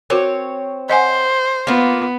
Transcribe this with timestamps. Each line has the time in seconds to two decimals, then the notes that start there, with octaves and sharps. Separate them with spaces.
0.10 C4 F#4 A#4 C#5
0.90 C5 D#5 F#5 G#5
1.67 A#3 B3 F4